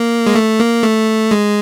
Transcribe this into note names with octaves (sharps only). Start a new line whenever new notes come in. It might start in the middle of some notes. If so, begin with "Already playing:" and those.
Already playing: A#3
G#3
A3
A#3
A3
G#3